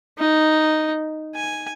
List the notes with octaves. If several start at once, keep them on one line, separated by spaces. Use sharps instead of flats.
D#4
G#5